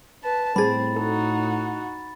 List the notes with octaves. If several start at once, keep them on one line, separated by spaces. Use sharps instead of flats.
B4 A5
A2 G3 C4 G#4 B5 A6
D#4 F#4 A4